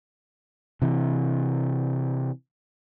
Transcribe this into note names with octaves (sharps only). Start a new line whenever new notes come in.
C3 E3